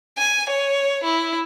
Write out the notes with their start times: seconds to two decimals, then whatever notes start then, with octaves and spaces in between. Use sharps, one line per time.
0.18 G#5
0.50 C#5
1.04 E4